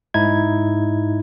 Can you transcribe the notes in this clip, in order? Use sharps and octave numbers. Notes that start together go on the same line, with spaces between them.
G#2 D#4 E4 G#6